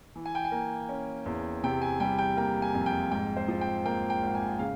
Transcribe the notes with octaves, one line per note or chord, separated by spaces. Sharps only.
E3
G#5
G5
G#5
A#3
C#4
E2
C3 G5
G#5
G3 G5
G5
A#3 G5
G#5
F2
G5
G#2 G5
C5
F3
G5
A#3 G5
G5
G#1
G#5
C#3 F5